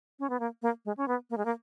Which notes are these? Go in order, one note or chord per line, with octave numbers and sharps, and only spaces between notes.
C#4
B3
A#3
A#3
G#3
C#4
B3
A#3
G#3
A#3